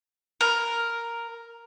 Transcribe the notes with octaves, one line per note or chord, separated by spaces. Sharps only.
A#4